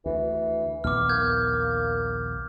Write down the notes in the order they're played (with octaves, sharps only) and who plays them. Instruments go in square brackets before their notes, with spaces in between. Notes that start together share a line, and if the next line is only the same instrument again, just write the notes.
[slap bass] D2 [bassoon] E3
[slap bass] A#1 D#2 B3 [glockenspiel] D6 F6
[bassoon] A#3 [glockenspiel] G6 G#6